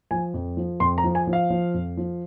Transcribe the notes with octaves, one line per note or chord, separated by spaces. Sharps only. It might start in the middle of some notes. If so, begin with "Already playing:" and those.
F3 G#5
F2
F3
F2 C6
A#5
F3
G#5
F3
F5
F3
F2
F3